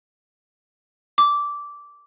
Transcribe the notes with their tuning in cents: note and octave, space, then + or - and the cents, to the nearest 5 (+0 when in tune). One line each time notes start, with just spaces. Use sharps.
D6 -10